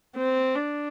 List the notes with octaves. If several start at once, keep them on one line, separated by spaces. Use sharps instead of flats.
C4
D4